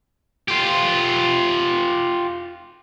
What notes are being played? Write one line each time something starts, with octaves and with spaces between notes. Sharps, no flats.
F4 G4